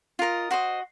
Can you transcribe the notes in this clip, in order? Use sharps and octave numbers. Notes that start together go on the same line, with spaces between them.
F4 A#4 D#5
F#4 C5 D#5